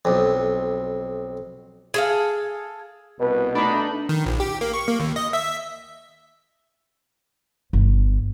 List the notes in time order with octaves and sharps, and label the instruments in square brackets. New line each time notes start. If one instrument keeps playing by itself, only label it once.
[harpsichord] B1 F2
[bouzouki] G#4 A4 F5
[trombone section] C2 B4 [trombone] B2
[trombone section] A3 [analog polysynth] D4 D#4 [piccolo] B5
[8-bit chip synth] D#3
A#1
G4
A#3
C#6
A#3
D#2
D#5
E5
[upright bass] G1